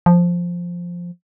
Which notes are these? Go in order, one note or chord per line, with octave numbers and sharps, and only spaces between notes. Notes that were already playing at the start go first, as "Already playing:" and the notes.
F3